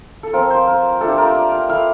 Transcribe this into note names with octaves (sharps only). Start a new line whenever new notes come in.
A4
F3 C4 F4 A#4
C5
A#4
A3 D4 F4 A4
G4
A#4
C5
D5
F5
A3 E4 F5